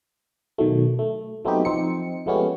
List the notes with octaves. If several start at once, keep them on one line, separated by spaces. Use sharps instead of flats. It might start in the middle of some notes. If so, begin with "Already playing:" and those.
B2 D#3 F#3 A3
A3
F#3 A3 B3 C4 D#4 G4
F3 C4 D#4 C#7
F3 G#3 A3 B3 C#4 G4